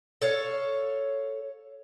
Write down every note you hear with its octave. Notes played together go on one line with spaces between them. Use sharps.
A4 C#5 F5